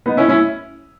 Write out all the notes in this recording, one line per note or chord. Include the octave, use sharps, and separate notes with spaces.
B3 D#4
C#4 E4
C#4 E4